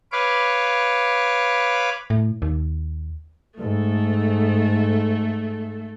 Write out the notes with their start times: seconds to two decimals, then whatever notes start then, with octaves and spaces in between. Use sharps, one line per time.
0.12 B4 C#5 F5 D6
2.10 A2
2.42 D#2
3.59 G#2 A3 A4